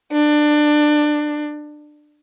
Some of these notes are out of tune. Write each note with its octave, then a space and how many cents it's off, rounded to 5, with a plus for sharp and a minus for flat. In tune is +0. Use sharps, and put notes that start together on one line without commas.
D4 +20